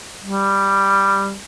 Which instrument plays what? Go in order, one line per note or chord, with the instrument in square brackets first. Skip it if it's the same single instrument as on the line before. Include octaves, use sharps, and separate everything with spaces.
[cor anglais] G3